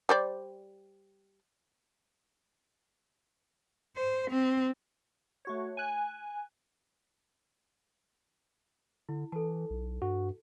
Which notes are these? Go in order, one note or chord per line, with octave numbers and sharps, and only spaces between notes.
G3 C5 D5
C5
C4
A3 F#4 C#5
G#5 F#6
D3 E4
E3 A4 A5
B1
G2 F#4